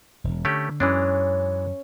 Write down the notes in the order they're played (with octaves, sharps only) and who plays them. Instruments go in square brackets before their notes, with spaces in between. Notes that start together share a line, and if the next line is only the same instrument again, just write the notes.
[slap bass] E1
[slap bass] D3 [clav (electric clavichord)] A3 C#4 G4
[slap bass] F#2 [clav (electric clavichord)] E3 G#3 D4 [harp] C#4